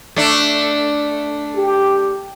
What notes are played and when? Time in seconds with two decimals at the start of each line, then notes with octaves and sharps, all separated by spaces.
0.16 A3 D4
1.56 G4